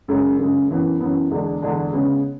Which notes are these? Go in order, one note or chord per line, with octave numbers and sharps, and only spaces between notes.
F#2 C#3 G#3
F#2 C#3 G#3
F#2 E3 B3
F#2 E3 B3
E2 D3 G#3 D4
E2 D3 G#3 D4
C#3 G#3 B3